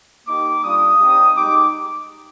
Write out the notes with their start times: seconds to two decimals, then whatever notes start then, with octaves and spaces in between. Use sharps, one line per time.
0.27 A#3 D#4 G4 D6
0.63 G3 D4 F4 D#6
0.99 G3 C4 D#4 G4
1.36 G#3 D#4 G4 D6